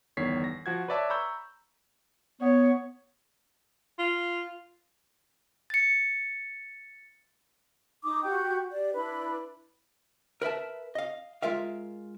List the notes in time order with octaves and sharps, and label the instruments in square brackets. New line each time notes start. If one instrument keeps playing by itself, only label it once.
[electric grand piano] G1 E2 D#3 C#5 B6 C7
A#6
F3 F#4 G#6
B4 C#5 D5 E5 A5
A#5 B5 C#6 E6 G6
[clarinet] B3 [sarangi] C#5
[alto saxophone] F4
[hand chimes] A6 C#7
[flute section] D#4 D6 D#6
F#4 G4 G5 G6
G4 D5
D4 E4 B4 B5
[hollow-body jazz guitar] A#4 B4 E5 A5
D#5 F5
G#3 F4 A#4 E5 F5